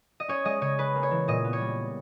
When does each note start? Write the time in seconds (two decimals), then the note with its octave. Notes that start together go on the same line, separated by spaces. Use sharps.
0.20 D#5
0.28 C#4 C#5
0.45 G#3 D#5
0.61 C#3 C#5
0.78 C#4 B4
0.95 A#3
1.03 C#5
1.11 E3
1.28 A#2 D#5
1.44 B3
1.53 C#5
1.61 G3